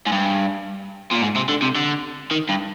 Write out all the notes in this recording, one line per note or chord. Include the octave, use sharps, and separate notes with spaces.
G#2
G2
A#2
G#2
C3
D3
C3
D3
D#3
G2